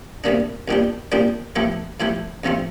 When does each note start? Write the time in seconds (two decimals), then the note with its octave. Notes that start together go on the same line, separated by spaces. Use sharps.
0.24 D2 C3 G3 A#3 D4
0.68 C2 A#2 G3 D4 G4
1.12 C2 A#2 G3 D4 G4
1.56 A2 F3 A3 E4 G4
2.00 A2 F3 A3 E4 G4
2.44 D2 C3 F3 A3 C4